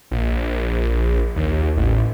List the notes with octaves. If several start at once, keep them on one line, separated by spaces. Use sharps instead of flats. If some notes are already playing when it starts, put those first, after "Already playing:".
A#1
D#2
A1